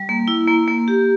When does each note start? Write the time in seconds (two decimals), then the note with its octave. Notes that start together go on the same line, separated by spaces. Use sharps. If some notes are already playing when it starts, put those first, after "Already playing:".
Already playing: G3
0.09 A#3
0.28 E4
0.48 A#3
0.68 A#3
0.88 G4